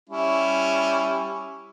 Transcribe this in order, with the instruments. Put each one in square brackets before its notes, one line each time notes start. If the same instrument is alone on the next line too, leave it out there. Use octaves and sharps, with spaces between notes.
[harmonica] G3 C#4 E4